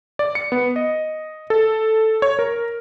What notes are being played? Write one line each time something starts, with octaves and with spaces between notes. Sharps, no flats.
D5
C#7
B3
D#5
A4
C#5
A#4